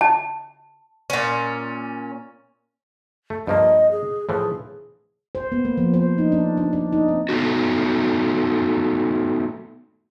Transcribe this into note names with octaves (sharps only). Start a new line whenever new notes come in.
A5
A#2 C#4
A3
G2 F3 A#3 D#5
G#4
A2 E3 F3 G#4
C5
B3
A#3
F3
C5
D#4
D4
D4
D4
D#4
C4
A3 B3 D#4 F#4